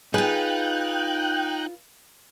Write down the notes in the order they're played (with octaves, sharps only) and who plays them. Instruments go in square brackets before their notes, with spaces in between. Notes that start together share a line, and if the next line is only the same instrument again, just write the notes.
[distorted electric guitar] D#4 [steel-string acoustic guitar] F4 B4 [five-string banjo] G#4 [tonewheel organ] G5 F#6